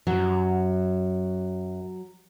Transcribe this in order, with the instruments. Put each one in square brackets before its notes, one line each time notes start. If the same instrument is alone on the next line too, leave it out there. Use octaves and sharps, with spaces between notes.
[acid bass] F#2 [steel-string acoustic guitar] F#3